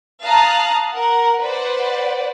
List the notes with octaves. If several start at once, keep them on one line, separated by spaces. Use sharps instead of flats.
F5 A5 A#5 D#6 F6 F#6
A#4 F#5
B4 C5 D5 F#5